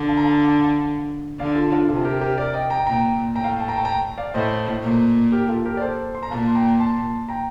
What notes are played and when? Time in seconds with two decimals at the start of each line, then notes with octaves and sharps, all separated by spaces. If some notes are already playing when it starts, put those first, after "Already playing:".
Already playing: D3
0.08 F5 A5
0.17 A#5
0.24 F5 A5
1.39 D3 D5 F5
1.55 F4 A4
1.72 D4 F4
1.88 C3 F4 A4
2.05 G4 A#4
2.21 G4 A#4
2.38 A#4 D5
2.54 D#5 G5
2.70 G5 A#5
2.87 A#2 G5 A#5
3.35 A2 G5 A#5
3.44 F5
3.52 G5
3.60 A5
3.68 G5 A#5
3.77 A5
3.85 G5 A#5
4.18 D5 F5
4.34 A2 C5 D#5
4.83 A#2
5.32 G4 A#4
5.49 F4 A4
5.65 G4 A#4
5.77 D5
5.81 A4 C5
6.15 C6
6.23 A#5
6.30 A#2 F5 A5
6.48 C6
6.55 G5 A#5
6.79 A5 C6
7.29 G5 A#5